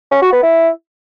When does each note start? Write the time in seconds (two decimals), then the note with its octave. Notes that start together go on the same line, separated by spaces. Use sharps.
0.11 C#4
0.22 F#4
0.32 B3
0.43 E4